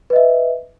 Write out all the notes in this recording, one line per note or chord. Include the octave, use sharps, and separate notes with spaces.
B4 D#5 E5